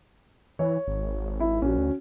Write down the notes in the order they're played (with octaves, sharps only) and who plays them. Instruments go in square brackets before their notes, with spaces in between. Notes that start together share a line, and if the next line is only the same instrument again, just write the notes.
[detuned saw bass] E3 [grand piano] C#5
[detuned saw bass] G#1
[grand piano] E4
[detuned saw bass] A#1 [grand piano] C#4 F#4
[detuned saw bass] D2